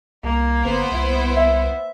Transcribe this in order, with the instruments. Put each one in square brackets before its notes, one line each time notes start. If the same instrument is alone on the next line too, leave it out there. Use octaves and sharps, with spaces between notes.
[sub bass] C2 [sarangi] A#3
[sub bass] G1 [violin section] B3 C5
[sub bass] C2 [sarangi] E4
[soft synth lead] E5